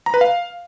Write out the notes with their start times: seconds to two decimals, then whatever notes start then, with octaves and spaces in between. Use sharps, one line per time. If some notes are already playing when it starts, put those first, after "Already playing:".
0.06 A#5
0.14 B4
0.21 F5